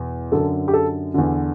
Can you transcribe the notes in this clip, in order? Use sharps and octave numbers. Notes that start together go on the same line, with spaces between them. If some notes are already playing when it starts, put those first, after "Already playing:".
Already playing: E2 B2
F#2 D3 A4
G4
A4
E2 D3